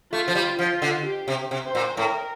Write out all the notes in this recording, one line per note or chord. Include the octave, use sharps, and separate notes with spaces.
A3 F4
F3
G3
F3 F4
D3
G4
C3
C3
C5
A#2
A2 A#4